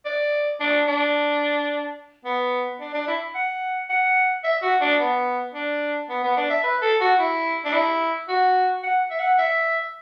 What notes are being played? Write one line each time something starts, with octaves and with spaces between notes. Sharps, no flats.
D5
D4
D4
B3
D4
D4
E4
F#5
F#5
E5
F#4
D4
B3
D4
B3
B3
D4
E5
B4
A4
F#4
E4
D4
E4
F#4
F#5
E5
F#5
E5